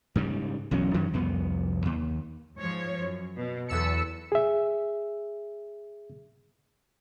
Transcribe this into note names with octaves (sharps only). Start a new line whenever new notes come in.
G#2 C#3 G3
B1 E2 F#3 C#4
F#2 D#3 E3
C2 F2 B3
D#2
G#2 F3 C#5
F#2
B2
E2 F#3 A4 B4 E6 C#7
G#4 E5